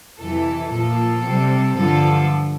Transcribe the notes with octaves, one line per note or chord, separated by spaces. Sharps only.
F2 C3 E3 A4
A#2 F3 A#3 A4
C3 G3 C4
G2 D3 F3 A4